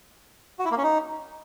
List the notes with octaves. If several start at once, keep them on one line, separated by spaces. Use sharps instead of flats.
F#4
E4
A#3
C#4
D#4